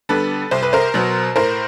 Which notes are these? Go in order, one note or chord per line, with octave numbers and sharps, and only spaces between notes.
D3 G3 B3 A4 B4
C2 C5
B4
A#4 C5
B2 F#3 B3
A2 A#4 C5